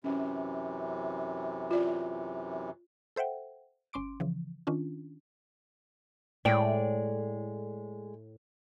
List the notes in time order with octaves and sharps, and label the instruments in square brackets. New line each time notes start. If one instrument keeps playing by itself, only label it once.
[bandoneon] F#2 C3 E3 [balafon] C#4
[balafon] F4 D5
[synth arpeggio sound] A4 C5 E5 F#5 G5
G1 C#4 C6 D6 D7
C#3 E3 F3
D#3 C#4 D4 F4
[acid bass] A2 [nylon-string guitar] G#3 D5 G5